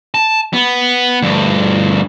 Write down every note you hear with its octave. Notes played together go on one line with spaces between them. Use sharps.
A5
B3
D2 G2